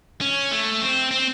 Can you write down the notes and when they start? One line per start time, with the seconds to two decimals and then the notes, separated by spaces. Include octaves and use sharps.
0.21 C#4
0.51 A3
0.82 C4
1.11 C4